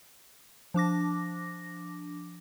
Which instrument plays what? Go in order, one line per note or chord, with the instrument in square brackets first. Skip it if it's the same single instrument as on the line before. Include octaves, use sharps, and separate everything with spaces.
[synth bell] F3 D4 D6 A#6